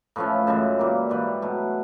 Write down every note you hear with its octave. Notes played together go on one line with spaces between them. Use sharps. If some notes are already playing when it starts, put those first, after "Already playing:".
A2 F3 A3 C#4 B4
F#2 C#3 E3 G#3 C5
A#2 G3 A#3
G#2 E3 G3 B4
B2 F#3 A3